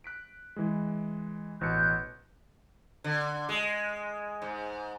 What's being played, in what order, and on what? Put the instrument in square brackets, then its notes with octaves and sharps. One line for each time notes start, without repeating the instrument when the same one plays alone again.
[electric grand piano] F#6 B6 D7
E3 G#3
[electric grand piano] A1 B2 C#7 [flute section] F#6 G6
[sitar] D3
G#3
G#2